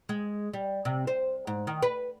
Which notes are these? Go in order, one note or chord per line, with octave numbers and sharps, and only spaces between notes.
G#3
G3
C3
C5
G#2
D#3
B4